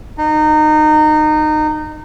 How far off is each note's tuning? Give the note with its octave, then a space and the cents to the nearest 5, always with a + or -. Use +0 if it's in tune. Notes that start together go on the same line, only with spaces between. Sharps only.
D#4 -25